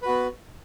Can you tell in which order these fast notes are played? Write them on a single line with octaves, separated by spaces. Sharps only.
B4 F#4 B3